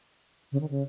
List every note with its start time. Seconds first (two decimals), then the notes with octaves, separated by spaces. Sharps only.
0.52 C#3
0.61 D#3
0.71 C#3